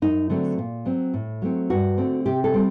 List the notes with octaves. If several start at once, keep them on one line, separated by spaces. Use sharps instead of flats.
F#2 D#4
D3 F#3 A3 C4
A#2
F#3 C4
A2
F#3 A3 C4
G2 F#4
D3 A3 C4
C3 G4
A4
G3 C4